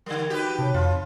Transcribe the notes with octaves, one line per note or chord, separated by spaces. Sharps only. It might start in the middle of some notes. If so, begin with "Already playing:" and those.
D3 G3 A#4
D#4 F#4 G4 B4
C3 C#5 A5
F2 F4